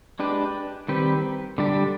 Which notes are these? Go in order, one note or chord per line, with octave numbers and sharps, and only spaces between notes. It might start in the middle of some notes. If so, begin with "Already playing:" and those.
G#3 D4 G4 B4
D#3 G3 C4 G4 B4
D3 G3 D4 G4